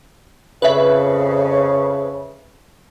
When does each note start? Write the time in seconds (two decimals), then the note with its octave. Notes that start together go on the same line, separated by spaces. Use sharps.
0.62 F2 C#3 B4 E5